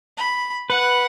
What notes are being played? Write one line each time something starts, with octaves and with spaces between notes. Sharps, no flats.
B5
B4 F#5